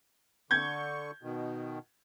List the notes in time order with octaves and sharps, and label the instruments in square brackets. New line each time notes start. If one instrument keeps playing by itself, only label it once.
[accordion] D3 C#6 [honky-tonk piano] G6 G#6
[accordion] B2 D#3